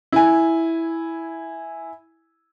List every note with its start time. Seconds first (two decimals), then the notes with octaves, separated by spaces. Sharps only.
0.12 E4 G#5